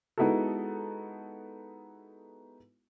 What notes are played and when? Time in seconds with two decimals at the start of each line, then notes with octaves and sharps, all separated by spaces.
0.18 G#3 B3 D#4 E4 F#4 A4